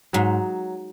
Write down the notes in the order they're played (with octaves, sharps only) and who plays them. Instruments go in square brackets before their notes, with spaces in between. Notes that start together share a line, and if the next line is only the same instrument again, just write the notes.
[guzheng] G#2 [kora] F#3